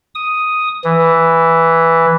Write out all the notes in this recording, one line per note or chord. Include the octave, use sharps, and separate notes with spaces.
D#6
E3